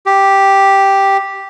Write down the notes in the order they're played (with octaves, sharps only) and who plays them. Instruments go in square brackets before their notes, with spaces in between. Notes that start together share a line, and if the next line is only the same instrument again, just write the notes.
[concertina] G4